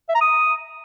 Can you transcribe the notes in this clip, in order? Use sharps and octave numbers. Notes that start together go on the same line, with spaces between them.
E5
A#5
D#6